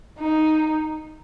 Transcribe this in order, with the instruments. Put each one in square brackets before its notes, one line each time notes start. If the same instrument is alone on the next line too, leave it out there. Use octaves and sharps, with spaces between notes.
[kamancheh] D#4